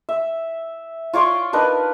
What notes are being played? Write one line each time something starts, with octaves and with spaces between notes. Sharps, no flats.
E5
F4 C#5 D5 C6
D4 D#4 A#4 B4